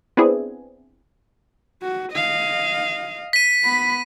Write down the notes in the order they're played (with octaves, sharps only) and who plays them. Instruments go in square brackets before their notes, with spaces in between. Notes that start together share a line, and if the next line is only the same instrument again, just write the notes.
[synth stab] B3 C4 D4 E4 G#4
[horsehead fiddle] F#4
D#5 F5
[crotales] B6 D#7
[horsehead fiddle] B3 B5